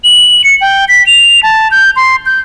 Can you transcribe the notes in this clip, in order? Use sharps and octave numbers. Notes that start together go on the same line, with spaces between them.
F#7
C#7
G5
B6
F7
A5
G6
C6
G6